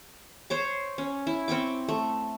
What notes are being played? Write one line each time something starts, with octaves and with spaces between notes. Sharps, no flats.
C5 C#5 D6
C#4
E4
C4 G5 C#6 D6
A3